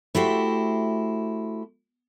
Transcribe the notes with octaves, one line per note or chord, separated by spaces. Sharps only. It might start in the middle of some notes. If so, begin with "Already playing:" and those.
A3 E4 F#4 G4 C5